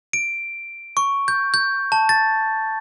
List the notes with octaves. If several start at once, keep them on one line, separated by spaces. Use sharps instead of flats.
D7
C#6
G6
G6
A5
A6